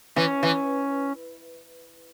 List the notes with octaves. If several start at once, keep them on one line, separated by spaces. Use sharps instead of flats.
E3 C#4
E3